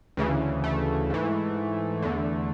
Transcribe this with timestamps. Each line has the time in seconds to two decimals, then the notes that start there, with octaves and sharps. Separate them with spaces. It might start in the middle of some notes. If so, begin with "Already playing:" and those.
0.17 D2 C#3 E3
0.64 A3
1.10 G#2 E3
2.02 E2 D3